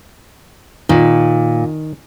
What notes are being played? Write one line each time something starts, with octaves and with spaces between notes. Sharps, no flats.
A#2 D#3